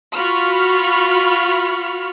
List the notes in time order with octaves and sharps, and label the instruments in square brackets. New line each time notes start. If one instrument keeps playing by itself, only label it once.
[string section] F4 F#4 B5 C#6 F6